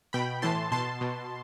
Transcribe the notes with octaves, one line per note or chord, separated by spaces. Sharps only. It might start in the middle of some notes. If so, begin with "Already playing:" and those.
B2 G5 B5
A2 E3 A5 C6
B2 A5 C6
B2